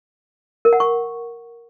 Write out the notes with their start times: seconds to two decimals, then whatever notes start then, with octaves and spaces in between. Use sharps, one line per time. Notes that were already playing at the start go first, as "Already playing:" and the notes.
0.65 A#4
0.73 F#5
0.80 C#6